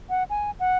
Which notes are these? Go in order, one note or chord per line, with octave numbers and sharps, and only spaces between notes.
F#5
G#5
F#5